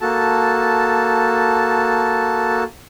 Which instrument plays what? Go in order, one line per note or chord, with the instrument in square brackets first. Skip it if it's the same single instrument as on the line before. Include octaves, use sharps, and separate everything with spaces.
[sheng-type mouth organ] A#3 F#4 A4 A5